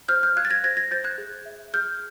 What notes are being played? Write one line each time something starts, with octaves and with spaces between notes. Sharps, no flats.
C5 F6 G6
F6 G6
F5 F#6 G#6
A6
G#6 A#6
C5 G#6 A#6
G#6 A#6
C5 G6 A6
F#6 G#6
G#4
E5
G#4 F6 G6